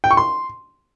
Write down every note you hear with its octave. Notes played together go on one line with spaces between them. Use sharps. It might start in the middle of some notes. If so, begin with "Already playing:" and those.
G5
C#6
C6